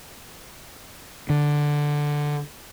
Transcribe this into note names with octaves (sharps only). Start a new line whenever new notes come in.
D3